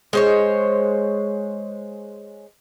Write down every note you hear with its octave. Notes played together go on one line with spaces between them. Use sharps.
G#3 C5 C#5